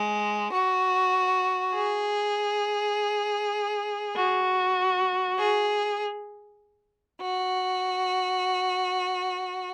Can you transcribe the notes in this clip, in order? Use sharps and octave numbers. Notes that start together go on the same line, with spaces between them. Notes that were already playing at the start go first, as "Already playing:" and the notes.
Already playing: G#3
F#4
G#4
F#4
G#4
F#4